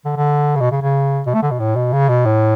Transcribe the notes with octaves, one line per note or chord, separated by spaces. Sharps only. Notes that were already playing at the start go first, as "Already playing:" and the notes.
D3
D3
C#3
B2
C#3
C#3
B2
A3
D3
B2
A2
B2
C#3
B2
A2